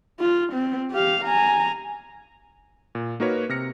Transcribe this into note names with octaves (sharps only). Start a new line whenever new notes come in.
F4
C4
G4 F5
G#5 A#5
A#2
A#3 D#4 F#4 A#4 B4 C#5
C3 F6 A#6 C#7